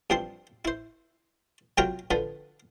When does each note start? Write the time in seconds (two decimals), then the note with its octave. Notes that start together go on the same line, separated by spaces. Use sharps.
0.10 G2 F3 C4 C6
0.65 E4 C5
1.78 C3 F#3 F4 A#4 G5 A#5
2.11 D3 F3 B4